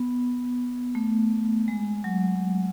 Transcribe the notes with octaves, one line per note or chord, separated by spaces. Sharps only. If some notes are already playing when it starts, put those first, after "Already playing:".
Already playing: B3
A3
G#3
F#3